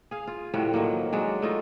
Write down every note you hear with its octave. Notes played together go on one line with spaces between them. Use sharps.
G#4 F5
F4
A2 F3 G3 F#4
D#3 F3 F#3 A#3
F#3 G#3 D4
A3 D#4 F4